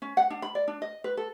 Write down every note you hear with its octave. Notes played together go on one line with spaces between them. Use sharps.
C#4
F#5
D4
B5
D5
D4
D#5
B4
A4